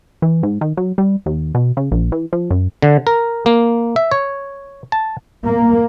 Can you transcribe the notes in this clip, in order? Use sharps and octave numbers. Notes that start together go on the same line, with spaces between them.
E3
G#2
D#3
F#3
G3
D#2
B2
C#3
A#1
E3
F3
F#2
D3
A#4
A#3
E5
C#5
A5
A#3